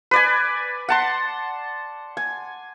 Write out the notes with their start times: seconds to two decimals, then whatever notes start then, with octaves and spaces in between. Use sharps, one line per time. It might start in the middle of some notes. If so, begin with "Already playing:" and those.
0.11 B4 D5 G#5
0.89 F#5 A5 C6
2.17 G#5